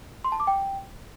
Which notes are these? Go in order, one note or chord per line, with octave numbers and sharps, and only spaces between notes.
C6
A5
D6
G5